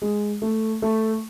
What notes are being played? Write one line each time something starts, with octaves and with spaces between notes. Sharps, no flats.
G#3
A3
A3